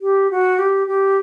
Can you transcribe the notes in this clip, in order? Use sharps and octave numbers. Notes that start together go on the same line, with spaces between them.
G4
F#4
G4
G4